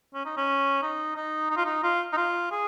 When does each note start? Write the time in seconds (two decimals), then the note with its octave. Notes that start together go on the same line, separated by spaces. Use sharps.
0.14 C#4
0.25 D#4
0.37 C#4
0.82 D#4
1.16 D#4
1.50 D#4
1.57 F4
1.65 D#4
1.84 F4
2.13 D#4
2.17 F4
2.51 G#4